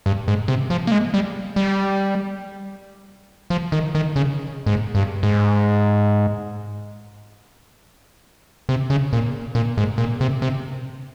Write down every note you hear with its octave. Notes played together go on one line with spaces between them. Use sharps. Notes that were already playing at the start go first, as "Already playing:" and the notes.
G2
G#2
C3
F3
A#3
G#3
G3
G3
F3
D#3
D#3
C#3
G#2
G2
G#2
C3
C#3
A#2
A#2
G#2
A#2
C3
C3